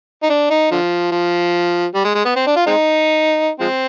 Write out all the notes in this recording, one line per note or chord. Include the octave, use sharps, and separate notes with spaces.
D#4
D4
D#4
D3 F3
F3
G3
G#3
G#3
B3
C4
D4
F4
G#3 C4 D#4
F3 G#3 C4